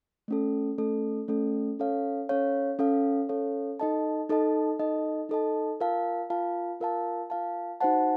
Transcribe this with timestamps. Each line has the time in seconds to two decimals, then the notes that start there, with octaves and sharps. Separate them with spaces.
0.28 A3 C#4 A4
0.78 A3 C#4 A4
1.28 A3 C#4 A4
1.79 C#4 A4 C#5 F5
2.29 C#4 A4 C#5 F5
2.79 C#4 A4 C#5 F5
3.29 C#4 A4 C#5 F5
3.80 D#4 A4 D#5 A5
4.29 D#4 A4 D#5 A5
4.79 D#4 A4 D#5 A5
5.29 D#4 A4 D#5 A5
5.80 F4 A#4 F5 A5
6.30 F4 A#4 F5 A5
6.80 F4 A#4 F5 A5
7.30 F4 A#4 F5 A5
7.81 D#4 F#4 C5 F#5 A5